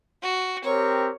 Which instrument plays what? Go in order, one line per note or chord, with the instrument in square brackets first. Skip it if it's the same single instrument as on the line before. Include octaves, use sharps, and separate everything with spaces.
[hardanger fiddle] F#4
[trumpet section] C4 G4 A#4 [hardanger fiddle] C#5